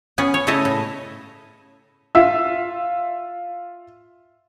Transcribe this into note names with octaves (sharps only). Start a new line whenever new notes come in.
B3 C#4 G#4
C#5
C#3 A3 E4 A4 D#5
A2
F4 E5 E6